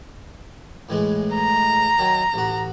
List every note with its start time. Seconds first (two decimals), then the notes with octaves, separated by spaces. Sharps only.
0.89 A2 E3 G#3
1.35 A#5
1.99 D#3 F#3
2.34 A1 F#4